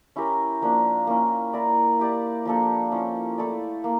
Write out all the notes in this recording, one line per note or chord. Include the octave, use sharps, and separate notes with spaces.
C#4 E4 G4 A#4
F3 A#3 D4
A#3 C#4 E4
E4 A#4 D5
E4 G4 D5
F3 A#3 D4 A4
F3 C#4 E4
A3 E4 A4 D5
A#3